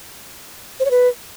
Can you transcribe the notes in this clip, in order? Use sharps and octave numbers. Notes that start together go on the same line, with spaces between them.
C5
C#5
B4